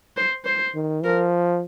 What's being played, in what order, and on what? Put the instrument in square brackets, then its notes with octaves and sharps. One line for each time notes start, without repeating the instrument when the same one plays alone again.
[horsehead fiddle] C5
C5
[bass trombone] D#3
[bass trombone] F3 [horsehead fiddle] A#4